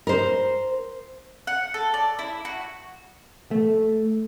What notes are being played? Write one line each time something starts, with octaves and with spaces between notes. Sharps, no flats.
A#4 C5
F#5
A4
D5
E4
F#4
A3